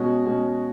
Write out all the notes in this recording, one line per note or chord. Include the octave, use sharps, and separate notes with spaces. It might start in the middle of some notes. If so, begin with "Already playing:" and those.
Already playing: B2 G#3 C#4 F#4
B2 G#3 C#4